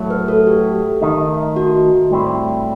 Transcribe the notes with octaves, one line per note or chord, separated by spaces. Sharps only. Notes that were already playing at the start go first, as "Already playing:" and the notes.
Already playing: A2 F#3 A3
B4
A4
G4
D#3 A3 D#4
F#4
A2 G3 C4 E4